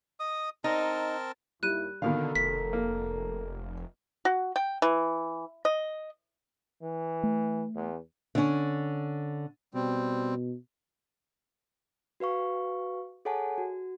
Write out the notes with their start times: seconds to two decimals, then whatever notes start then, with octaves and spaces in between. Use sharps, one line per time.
0.20 D#5 D#6
0.64 C4 D#4 A#4 A5
1.63 D#2 G3 E4 F#6 D#7
2.02 B2 D3 D#3 A4 A#4 F5
2.35 F1 B6
2.73 A#3
4.25 F#4
4.56 G5
4.82 E3
5.65 D#5
6.82 E3
7.23 A3
7.75 E2
8.35 D3 C#4
9.74 B2 G3 C4
12.20 F#4 B4 F5 C#6
13.25 G#4 A4 C#5 F#5 G#5 A5
13.58 F#4